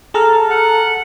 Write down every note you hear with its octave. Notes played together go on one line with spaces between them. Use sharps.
G#4 A4 A#5 F6
F#5